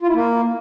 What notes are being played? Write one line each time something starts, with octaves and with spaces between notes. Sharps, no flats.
F4
E4
A#3